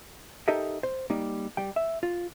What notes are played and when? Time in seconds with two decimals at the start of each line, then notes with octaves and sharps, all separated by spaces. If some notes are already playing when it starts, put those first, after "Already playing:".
0.48 D#4 G4 A4 A#4 D#5 E5
0.83 C5
1.10 G3 A#3 D#4
1.57 G3 G5
1.76 E5
2.03 F4